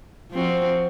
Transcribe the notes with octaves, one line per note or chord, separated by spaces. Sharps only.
F3 C4 F#4